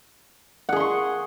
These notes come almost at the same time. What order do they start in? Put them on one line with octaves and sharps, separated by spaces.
F#5 G#4 C6 C#6